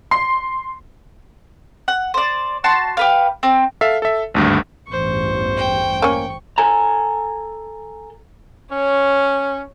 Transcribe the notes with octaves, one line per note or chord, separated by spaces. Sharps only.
C6 C7
F#5
C5 D5
F#4 A5 C6
G4 B4 F5
C4
A4 E5 F5
A4 E5
G#1 D2 G2
A1 E2 G2 C5 C#6
G5
A#3 C#4 C#6
A4 G#5 A#5
C#4 C#5